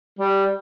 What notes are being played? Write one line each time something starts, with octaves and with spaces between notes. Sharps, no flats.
G3